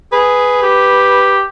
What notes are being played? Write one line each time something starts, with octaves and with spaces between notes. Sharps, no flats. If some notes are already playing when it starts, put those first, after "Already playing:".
G#4 B4
G4